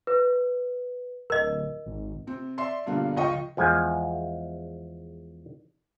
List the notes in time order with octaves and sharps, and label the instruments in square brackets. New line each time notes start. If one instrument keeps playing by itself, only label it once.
[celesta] B4
[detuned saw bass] D1 [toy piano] A#4 D#5
[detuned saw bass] G#1
[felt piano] C3 C4
D5 E5 C6 C7
G2 B2 D3 G3 A#3 F4
C#2 F3 F4 D#5 G5 C#6
[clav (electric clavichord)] E2 F3 G#3 G#5